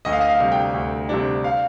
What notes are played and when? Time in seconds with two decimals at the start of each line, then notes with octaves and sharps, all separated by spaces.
0.05 D2 D#5
0.12 F5
0.21 D#5
0.29 F5
0.39 C3 G3 D4
0.52 G5
0.74 D2
1.09 C3 G3 D4
1.44 F5